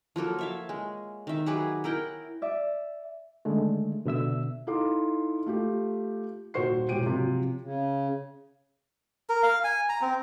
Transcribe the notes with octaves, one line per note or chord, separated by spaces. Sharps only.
F3 F#3 A#3 A4
C#5 E5 F5
G#3
D#3 E5
F#3 G4 G#4 B4
E4 A#4 F#5 G5
D5 E5
D3 D#3 G#3 A3
B2 D3 E5 E6
D#4 E4 A4 F5 C6 D6
A3 F4 G4
D#1 F#4 C5 C#6 C7
E1 G4 G5 D7 D#7
C3 F3 F#3
C#3
A#4
F5
G#5
A#5
C4